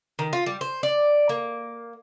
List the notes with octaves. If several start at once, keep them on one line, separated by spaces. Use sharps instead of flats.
D#3
F4
G3
C5
D5
A#3